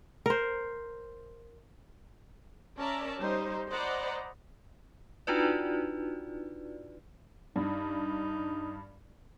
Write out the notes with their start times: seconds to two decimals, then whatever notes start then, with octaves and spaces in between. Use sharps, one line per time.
0.26 A#4 C5
2.77 C#4 A#4 D5 E5 A5 A#5
3.20 G3 D#4 C5
3.69 C5 D5 D#5 F#5 A#5 B5
5.27 D4 D#4 F4 F#4 B4 D5
7.56 G2 D#4